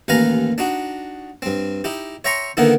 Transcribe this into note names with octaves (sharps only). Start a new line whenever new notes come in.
A1 D#2 B4 F5 G#5 A#5
D4 D#4 F#4
G2 C4
D#4 E4 G4
C#5 E5 G5 A#5 C6 C#6
D3 D#3 A#3 B3 D#4 E4